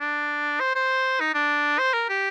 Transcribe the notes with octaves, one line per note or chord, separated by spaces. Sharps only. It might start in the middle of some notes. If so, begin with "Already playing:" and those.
D4
C5
C5
D#4
D4
C5
A#4
G4